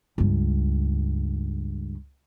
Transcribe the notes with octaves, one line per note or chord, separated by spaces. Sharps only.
C#2 G2